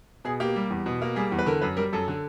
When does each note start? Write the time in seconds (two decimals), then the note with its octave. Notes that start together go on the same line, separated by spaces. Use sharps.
0.24 B2 G#4
0.40 A#3 G4
0.56 G3
0.70 E2
0.86 B2
1.02 A#3
1.16 G3 G#4
1.32 E2
1.39 B4
1.46 D3 A#4
1.61 F#2 B4
1.77 G3 A#4
1.93 F#2 A4
2.08 D3